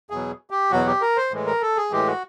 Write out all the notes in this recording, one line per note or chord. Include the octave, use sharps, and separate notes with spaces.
E2 B2 F#3 G#4
G4
E2 B2 F#3 F#4
G4
A#4
C5
A2 E3 G#3
A#4
A4
G#4
A2 E3 G#3 G4
F#4